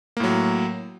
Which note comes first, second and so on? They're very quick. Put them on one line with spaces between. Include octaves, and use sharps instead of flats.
A#3 A2 F#3